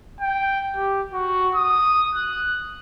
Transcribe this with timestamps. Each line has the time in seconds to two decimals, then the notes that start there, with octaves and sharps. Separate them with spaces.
0.21 G5
0.76 G4
1.14 F#4
1.55 D#6
2.15 F#6